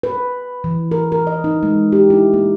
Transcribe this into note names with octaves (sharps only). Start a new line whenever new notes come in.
B4
E3
A#4
A#4
D#5
D#4
G#3
G4
E4
A#3